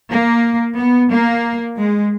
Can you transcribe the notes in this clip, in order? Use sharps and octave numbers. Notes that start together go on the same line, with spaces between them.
A#3
B3
A#3
G#3